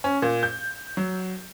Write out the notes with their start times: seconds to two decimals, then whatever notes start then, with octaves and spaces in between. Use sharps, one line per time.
0.04 C#4
0.22 A#2
0.43 G6
0.97 F#3